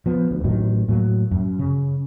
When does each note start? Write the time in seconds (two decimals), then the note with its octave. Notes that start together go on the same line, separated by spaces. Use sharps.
0.06 F3 B3
0.31 D2
0.44 A1 A2 D#3 F#3
0.88 A2 F#3 A#3
1.31 F#2
1.59 C#3